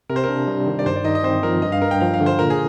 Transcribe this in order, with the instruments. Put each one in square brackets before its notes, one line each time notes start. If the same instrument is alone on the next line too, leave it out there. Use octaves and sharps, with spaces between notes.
[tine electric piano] C3 [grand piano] A#4
[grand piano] C5
[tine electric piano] D4 [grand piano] A#4
[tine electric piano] G3
D#3
[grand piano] D5
[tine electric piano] G2 [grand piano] C5
[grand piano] D5
[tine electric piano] D#4 [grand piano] D#5
[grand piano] D#5
[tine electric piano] C4 [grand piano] C5
[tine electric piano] F3 [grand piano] A#4
[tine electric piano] G2 [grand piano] D#5
[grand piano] F5
[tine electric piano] G2 [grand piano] A#4
[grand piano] G5
[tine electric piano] F3 [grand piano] F5
[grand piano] F5
[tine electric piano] D3
[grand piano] C5
[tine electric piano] A#2 [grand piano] A#4
[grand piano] G#4